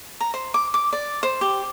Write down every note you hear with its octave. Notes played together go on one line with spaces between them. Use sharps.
A#5
C5
D6
D6
D5
C5
G4